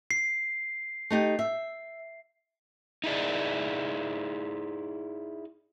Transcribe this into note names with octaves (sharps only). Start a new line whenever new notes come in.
C7
A3 D#4 G4
E5
D#4 E4 G#4 D5